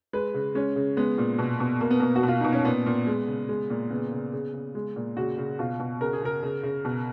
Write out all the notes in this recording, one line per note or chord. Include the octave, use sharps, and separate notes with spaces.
G#3 B4
C#3
G#3 C#4
C#3
G#3 B3
A#2
B2
B2
B2 A#3
B3
B2 A#3
F#4
B2
F4
B2 D#4
C#4
A#2 B3
A#2
G#3
C#3
G#3
A#2
C#3 B3
C#3
C#3
C#3
G#3
A#2
C#3 F#4
C#3
B2 F4
B2
C#3 A#4
G#4
C#3 A#4
C#3
C#3
B2